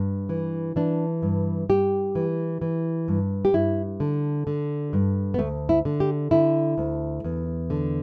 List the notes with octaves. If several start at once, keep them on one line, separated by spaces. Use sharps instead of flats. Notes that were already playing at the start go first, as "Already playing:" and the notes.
Already playing: G2
E3
E3 D4
G2
G2 G4
E3
E3
G2
G4
G2 E4
D3
D3
G2
B3
D2 A3
E4
D3
G4
D3 E4
D2
E2
D3